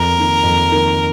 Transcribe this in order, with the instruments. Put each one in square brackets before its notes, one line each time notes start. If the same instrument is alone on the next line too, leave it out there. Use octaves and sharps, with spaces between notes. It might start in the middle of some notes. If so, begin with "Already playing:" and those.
Already playing: [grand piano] F2 [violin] A#4
[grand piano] D#3 A#3
F2
D#3 A#3